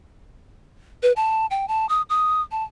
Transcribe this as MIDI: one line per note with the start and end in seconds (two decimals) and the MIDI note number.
1.03 1.12 71
1.16 1.46 81
1.51 1.68 79
1.68 1.88 81
1.89 2.02 87
2.10 2.42 87
2.51 2.64 81